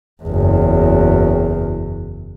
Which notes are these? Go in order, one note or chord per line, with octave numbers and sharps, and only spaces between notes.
F#1 E2